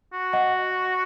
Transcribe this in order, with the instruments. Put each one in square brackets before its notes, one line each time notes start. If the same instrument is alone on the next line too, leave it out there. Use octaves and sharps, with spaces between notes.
[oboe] F#4
[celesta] D#5 F#5